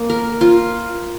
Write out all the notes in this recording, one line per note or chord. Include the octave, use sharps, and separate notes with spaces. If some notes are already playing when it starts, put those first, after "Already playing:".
Already playing: A#3
A#4
F4